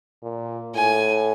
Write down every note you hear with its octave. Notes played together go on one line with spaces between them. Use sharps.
A#2
A2 G#5